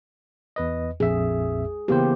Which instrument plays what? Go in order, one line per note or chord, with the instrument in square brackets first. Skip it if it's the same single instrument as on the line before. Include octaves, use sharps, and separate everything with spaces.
[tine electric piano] E2 B4 D#5
[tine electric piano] A#1 F2 E5 [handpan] G#4
[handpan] C#3 B3 G4 [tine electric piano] E3 A#3 C5